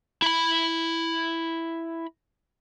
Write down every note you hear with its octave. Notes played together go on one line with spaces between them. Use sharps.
E4 B5